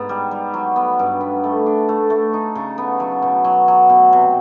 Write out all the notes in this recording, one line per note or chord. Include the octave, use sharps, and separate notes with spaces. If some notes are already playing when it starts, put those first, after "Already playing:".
Already playing: G#2 B3
G3
G3
F#3
B3
G2
B3
A3
D4
A3
A3
D#4
C#3
B3
F#3
B2
F#3
F#3
B2
C3